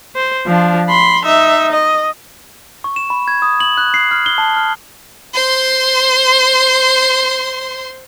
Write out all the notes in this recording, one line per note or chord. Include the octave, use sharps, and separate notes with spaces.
C5
F3 D4
B5 C6
D#4 E5
D#5
C#6
E7
B5
G#6
D#6
F#7
F#6
C7
F6
G7
A5
F6
C5 C6